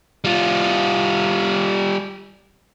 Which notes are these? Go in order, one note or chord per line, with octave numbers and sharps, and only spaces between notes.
G3 F4